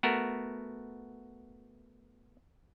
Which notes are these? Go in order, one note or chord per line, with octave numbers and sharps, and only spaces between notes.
A3 B3 F#4 A#4